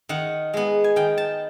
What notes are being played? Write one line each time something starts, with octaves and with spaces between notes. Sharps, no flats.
D#3 F#5
G#3 B3
G#5
D#3 G5
A5